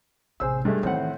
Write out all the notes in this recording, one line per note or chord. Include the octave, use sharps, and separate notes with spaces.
A1 C3 G#4 C5 E6
G2 G#3 A3
A2 D#3 E3 C4 F#5